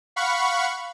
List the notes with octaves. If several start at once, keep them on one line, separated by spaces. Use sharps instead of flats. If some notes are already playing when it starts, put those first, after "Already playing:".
F5 F#5 B5 C#6